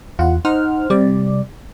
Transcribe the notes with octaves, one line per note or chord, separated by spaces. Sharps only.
E2 F4 F#5
D#4 C5 F#5 F6
C3 G3 D5